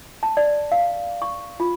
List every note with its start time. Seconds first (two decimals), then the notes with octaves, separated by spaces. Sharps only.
0.23 A5
0.37 D5
0.72 F5
1.22 C#6
1.60 F4